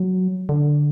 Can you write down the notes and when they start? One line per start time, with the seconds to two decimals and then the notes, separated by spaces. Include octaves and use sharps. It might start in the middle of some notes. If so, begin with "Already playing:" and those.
Already playing: F#3
0.49 D3